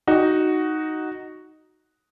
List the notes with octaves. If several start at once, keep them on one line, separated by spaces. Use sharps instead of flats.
D#4 F#4